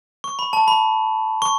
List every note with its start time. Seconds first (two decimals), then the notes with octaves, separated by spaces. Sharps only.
0.24 C#6
0.39 B5
0.53 A5
0.68 B5
1.42 C#6